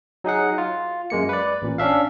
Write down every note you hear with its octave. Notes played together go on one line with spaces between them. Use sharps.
F#3 D#4 G#4 F#5
F4
F#2 G#3 A#3 C#7
B4 D5
A1 A#2
C#4 D4 E5 F5